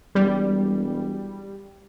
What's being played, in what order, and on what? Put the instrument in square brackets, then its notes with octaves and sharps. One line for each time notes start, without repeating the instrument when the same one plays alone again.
[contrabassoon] E1 [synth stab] G3